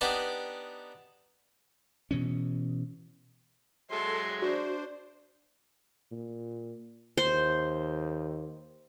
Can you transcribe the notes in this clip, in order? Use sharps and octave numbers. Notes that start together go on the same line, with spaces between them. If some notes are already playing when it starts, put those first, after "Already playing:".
B3 D4 D#4 G4 D5
B2 E3 C#4
F#3 G#3 A4 E5 C6
D4 F#4 C5
A#2
D#2 C5